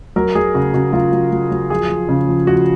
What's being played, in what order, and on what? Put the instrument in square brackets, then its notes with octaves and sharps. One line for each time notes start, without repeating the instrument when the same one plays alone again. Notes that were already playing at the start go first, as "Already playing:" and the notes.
[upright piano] F#3 A#4
F#3 G#4
C#3 F#4
C#3 F#4
F#3 F4
F#3
F#3
F#3
F3 G#4
F3
C#3
F3
F3 F#4